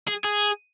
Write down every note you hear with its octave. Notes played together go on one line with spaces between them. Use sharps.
G#4
G#4